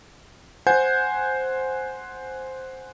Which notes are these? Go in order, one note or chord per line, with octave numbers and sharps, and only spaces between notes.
C5 F#5 G#5 G6